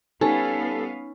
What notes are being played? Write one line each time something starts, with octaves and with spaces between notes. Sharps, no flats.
G3 B3 C#4 D#4 A4 F5